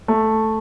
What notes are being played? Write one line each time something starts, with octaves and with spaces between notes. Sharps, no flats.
A3